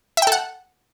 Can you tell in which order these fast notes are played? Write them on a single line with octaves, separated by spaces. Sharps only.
E5 G5 A4 F#5